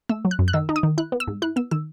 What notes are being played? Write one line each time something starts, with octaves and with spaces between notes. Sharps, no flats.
A3 E6
F#3
F#6
F#2
F#6
D#3 E6
D#4
D#6
D#3
E4 F#6
B3
E6
G#2
E4 F#6
B3 E6
D#3 E6